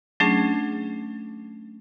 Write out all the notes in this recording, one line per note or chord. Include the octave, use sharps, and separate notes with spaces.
F#3 A3 C#4 D4 G#4